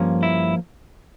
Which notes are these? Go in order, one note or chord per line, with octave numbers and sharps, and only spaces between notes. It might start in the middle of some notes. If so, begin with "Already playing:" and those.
Already playing: G2 F3 A#3 C#4
E4